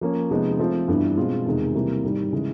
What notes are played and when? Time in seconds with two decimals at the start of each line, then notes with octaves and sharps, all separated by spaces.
0.01 F3 A#3 C#4
0.31 C3 F3 G#3 B3 D#4
0.59 F3 A3 C4 F4
0.88 G2 E3 G3 B3 D4
1.17 B2 G#3 C4 F4
1.45 E2 C3 D#3 G#3
1.75 C3 E3 G3 A#3
2.04 G#2 D#3 G3
2.32 C#3 E3 G#3